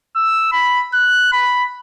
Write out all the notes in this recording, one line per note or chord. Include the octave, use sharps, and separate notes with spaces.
E6
B5
F#6
B5